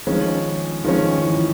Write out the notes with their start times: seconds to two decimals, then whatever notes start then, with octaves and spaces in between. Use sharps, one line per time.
0.07 D#3 F3 G#3 C#4
0.85 D#3 F3 G#3 C#4
1.23 E3